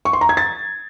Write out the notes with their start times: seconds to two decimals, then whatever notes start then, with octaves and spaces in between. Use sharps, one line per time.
0.05 C#6
0.13 C6
0.21 A#5
0.29 G#6
0.37 A6